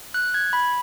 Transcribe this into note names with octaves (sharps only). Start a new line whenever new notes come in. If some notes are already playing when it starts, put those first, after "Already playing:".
F#6
G#6
B5